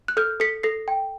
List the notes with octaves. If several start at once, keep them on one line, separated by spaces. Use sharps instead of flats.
F#6
A4 F6 G6
A4 B6 C#7
A4 A#6 C7
G5